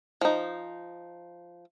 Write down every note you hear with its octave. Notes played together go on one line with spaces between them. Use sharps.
F3 D#4